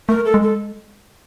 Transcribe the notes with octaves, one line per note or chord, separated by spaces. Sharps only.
A3 A#4
A4
G#3
A4